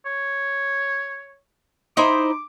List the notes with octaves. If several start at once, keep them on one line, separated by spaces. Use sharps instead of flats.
C#5
D#4 E4 C5 D6